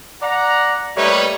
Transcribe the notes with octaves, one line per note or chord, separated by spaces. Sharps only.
D5 F#5 A#5
G3 A3 A#3 D#4 B4 C#5